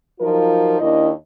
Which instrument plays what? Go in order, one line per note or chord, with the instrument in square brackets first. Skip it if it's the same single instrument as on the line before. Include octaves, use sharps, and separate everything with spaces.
[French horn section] F3 F#3 D#4 F4 A#4
D#2 D#3 D4 E4 D#5